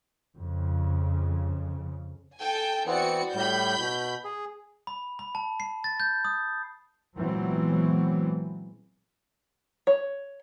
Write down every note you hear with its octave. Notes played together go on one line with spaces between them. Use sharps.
F2 C#3
A4 G5 G#5
E3 B3 C4 F#4 D5 C#7
A2 G3 B5 G6
B2
G#4
B5
B5
A5
C7
A6
G6
D#6
A#2 E3 F#3 G#3 B3 C4
C#5